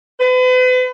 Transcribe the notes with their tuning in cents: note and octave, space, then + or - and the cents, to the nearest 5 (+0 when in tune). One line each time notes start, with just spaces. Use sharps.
B4 +40